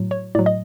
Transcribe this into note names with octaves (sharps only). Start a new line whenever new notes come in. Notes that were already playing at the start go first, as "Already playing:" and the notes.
Already playing: A2 F#3
C#5
A2 F#3 D5
D#5